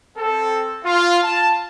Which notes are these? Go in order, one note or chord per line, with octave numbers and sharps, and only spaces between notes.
C4 A4
F4
A5